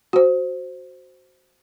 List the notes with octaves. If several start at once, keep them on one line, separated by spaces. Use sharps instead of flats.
F#4 C5